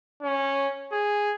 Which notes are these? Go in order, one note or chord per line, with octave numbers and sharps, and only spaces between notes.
C#4
G#4